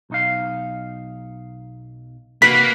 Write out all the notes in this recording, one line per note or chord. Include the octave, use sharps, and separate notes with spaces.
B1 D#4 F5
C3 A#3 F#4 B4 B6